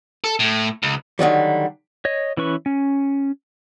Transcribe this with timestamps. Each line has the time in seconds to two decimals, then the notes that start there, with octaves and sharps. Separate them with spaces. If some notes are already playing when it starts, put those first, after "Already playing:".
0.24 A4
0.40 A2
0.83 C#2
1.19 D3 D#3 F#3 G3
2.05 C#5 D#5
2.37 E3 C#4 B4 C#6
2.66 C#4